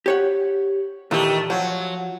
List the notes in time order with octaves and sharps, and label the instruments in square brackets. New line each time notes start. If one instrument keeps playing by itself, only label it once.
[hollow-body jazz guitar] G4 C#5 F#5
[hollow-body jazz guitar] A#2 E3 [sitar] D#3 A3 G4
[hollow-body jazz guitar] F3 [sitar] F#3